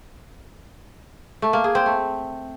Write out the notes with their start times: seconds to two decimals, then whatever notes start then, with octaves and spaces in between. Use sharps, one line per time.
1.42 A3
1.53 A#3
1.64 G#4
1.75 C4
1.86 A3